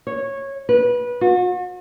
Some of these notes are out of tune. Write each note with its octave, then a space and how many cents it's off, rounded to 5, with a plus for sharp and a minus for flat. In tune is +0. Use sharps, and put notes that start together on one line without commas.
C#5 -15
B4 -20
F#4 -40